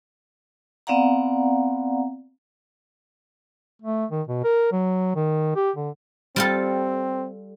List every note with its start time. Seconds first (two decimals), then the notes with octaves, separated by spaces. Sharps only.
0.87 B3 C4 D5 F5 F#5 A#5
3.82 A3
4.11 D#3
4.28 B2
4.44 A#4
4.72 F#3
5.16 D#3
5.55 G4
5.76 D3
6.36 G3 C4 F4 A4